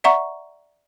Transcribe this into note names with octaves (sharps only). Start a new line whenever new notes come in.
D5 E5 F#5 A#5 C#6